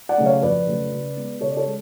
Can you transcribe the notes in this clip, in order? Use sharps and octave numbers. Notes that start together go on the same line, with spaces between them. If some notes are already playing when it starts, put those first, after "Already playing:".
D5 F#5
C#3 F#3 A3
C#5 F5
F2 B4 D5
C#3 F#3 A3
C#3
G#3 B3
C#3 A4 C#5
D5
A4 C#5
G#3